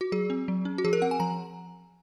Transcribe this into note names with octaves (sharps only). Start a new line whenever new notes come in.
F#4
F#3 G#4
C4
F#3
C#4
F#4
F3 G#4
A#4
C4 F#5
G#5
F3 A#5